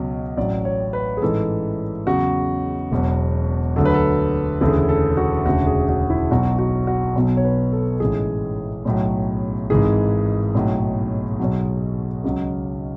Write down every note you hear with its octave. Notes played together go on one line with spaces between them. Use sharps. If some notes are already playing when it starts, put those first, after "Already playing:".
Already playing: C#2 B2 F#3
A1 A2 F#3 D5
C#5
B4
G#4
A1 G#2 E3 A4
E2 C#3 F#3 F#4
E1 E2 B2 F#3
D2 D3 F#3 A4
B4
A4
E1 D2 C#3 E3 A4
G#4
A4
A4
F#4
E1 D2 C#3 F#4
G#4
F#4
E4
B1 B2 F#3 F#4
F#4
F#4
B1 B2 F#3
C#5
B4
A4
A1 G#2 E3 G#4
B1 A2 F#3
G#1 G#2 E3 G#4
B1 A2 F#3
B1 B2 F#3
C#2 C#3 F#3